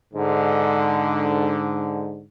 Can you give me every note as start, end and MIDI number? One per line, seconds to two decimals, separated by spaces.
0.14 2.24 44
0.14 2.24 50